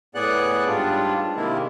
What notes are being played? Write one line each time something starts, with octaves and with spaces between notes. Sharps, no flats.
A2 B3 G#4 D5 F#5 F#6
G#2 G3 D4 F4
C3 D#3 G#3 A#3 E4